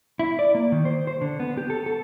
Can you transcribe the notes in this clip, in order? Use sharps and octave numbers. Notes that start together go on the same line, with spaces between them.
E4
D5
A#3
D#3
C5
C5
D3
B3
G4
A4
A4